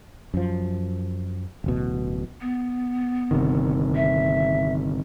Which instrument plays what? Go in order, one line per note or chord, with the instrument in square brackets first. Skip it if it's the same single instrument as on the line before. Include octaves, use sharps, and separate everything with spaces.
[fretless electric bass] F#2 F3
D1 A1 B2
[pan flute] B3
[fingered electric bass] G1 C3 D#3
[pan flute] E5